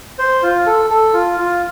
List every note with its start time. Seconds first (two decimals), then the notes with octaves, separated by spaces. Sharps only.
0.19 C5
0.43 F4
0.66 A4
0.90 A4
1.13 F4
1.38 F4